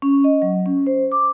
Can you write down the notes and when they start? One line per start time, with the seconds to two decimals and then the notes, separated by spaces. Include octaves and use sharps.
0.02 C#4
0.24 D#5
0.42 F#3
0.66 C#4
0.87 C5
1.12 D6